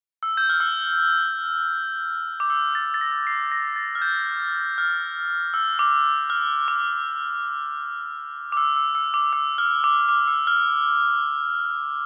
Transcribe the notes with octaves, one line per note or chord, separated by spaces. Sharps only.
E6
G6
F6
E6
D6
E6
A6
A6
A#6
C7
A#6
A6
F6
G6
F6
E6
D6
F6
D6
D6
E6
E6
E6
D6
E6
F6
D6
D6
E6
F6